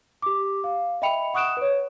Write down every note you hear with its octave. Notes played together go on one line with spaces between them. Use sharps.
G4 D6
F5
D#5 E5 G5 B5 C#7 F7
F#5 C#6 D#6 F#6 D7 E7
B4 C#5